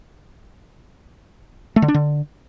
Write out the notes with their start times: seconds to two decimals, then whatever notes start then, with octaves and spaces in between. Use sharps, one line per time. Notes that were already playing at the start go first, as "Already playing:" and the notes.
1.76 A3
1.82 D3
1.88 D4
1.94 D3